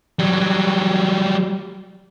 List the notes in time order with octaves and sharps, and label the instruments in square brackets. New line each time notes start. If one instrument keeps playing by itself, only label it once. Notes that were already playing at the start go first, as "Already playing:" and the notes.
[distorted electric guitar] F#3 G3